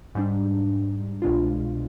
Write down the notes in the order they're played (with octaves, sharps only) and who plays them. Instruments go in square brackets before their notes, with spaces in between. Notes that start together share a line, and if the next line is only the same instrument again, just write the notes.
[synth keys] G#2 G3 D4
C2 B2 G#3 D4 F4